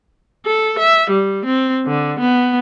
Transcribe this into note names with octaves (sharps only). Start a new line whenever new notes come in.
A4
E5
G3
C4
D3
B3